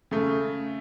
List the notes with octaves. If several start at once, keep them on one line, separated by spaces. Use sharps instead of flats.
C#3 A3